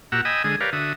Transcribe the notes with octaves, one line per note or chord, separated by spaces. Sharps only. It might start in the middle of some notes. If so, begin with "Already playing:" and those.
A#2 F#4 G4 F#5 A#5 E6
D#5 G5 G#5 B5 D#6 E6
D3 G#3 G#4 D#6
G4 A#4 B4 C#5 D5 F5
D3 F#4 E5 D#6